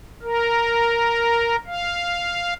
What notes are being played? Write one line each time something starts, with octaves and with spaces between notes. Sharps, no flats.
A#4
F5